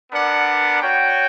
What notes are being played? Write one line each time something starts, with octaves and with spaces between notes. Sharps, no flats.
B3 D4 A#4 D5 F#5
F#4 C#5 G5